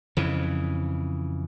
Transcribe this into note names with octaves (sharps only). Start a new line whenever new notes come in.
F2 C#3 E3